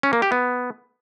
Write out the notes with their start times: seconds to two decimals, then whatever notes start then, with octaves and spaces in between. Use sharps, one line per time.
0.03 C#4
0.13 A#3
0.22 G4
0.32 B3